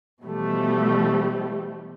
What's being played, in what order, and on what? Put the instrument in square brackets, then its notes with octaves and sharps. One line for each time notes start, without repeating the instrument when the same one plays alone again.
[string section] B2 E3 F3 G3 A3